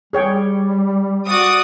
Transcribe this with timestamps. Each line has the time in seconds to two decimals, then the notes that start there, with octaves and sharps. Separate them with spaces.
0.13 G3 G#4 C#5 G5
1.27 F#4 D5 D#6